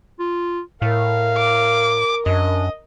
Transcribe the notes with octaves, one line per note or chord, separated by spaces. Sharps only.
F4
A2 A#4 F5
D6
F#2 D4 D#5